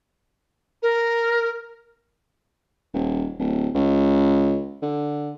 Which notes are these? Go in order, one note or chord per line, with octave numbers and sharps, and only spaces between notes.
A#4
D#1
D1
C#2
D3